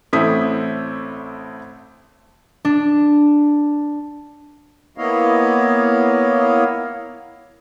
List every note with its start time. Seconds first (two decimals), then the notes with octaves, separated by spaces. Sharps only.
0.13 A1 A3 C4 E4 D#6 B6
2.65 D4
4.98 A#3 B3 E4 C#5 D#5 F5